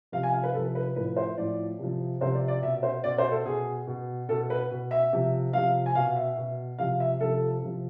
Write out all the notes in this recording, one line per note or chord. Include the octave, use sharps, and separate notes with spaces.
C3 F3 F5
G#5
F5
B4
C3 F3 A4
B4
A2 F3 B4
C5
A2 F3 D5
C3 F3
C3 F3 C5
D5
D5
B2 E5
C5
B2 D5
C5
A4
B2 G#4
B2
B2 A4
B4
B2
E5
C3 F3
C3 F3 F5
G#5
B2 F5
E5
B2
C3 F3 F5
E5
C3 F3 A4
C3 F3